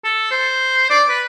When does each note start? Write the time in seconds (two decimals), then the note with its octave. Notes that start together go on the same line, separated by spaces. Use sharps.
0.05 A4
0.31 C5
0.90 D5
1.09 B4